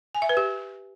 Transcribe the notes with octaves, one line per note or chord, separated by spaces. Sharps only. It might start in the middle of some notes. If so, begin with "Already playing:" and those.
G#5
E5
B4
G4